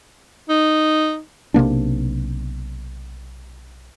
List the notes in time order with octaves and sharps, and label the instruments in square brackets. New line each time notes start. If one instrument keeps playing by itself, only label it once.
[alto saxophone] D#4
[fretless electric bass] B1 C3 A#3 D4